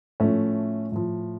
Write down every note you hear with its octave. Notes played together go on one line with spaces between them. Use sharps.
A2 F3 A3 C#4
A2 F3